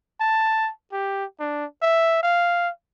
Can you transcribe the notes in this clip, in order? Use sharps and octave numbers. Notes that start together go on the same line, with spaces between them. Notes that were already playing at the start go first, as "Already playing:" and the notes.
A5
G4
D4
E5
F5